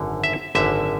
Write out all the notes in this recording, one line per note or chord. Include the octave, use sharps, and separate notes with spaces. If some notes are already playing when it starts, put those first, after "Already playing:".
Already playing: G#1 F#2 D3
E5
G#1 F#2 D3 E5